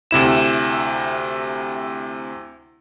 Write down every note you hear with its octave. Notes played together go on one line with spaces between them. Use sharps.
D2 C3 E4 E7